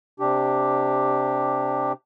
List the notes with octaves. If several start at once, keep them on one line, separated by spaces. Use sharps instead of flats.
C3 D4 G4